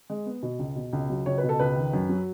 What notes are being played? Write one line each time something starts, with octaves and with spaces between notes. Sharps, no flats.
G#3
B3
B2
C#2
B2
C#2
F#3
C#2 C#5
B4
B2
A4
C#2 B4
D#3
F#2
F#3